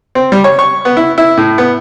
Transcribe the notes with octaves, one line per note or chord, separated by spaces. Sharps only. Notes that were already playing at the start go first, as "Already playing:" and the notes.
C4
G3
C#5
C#6
B3
E4
E4
A2
B3